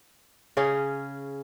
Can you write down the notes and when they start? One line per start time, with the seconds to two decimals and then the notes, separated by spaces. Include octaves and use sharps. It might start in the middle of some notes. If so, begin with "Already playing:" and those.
0.57 C#3 C#4 G#4